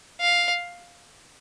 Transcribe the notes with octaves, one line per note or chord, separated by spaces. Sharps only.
F5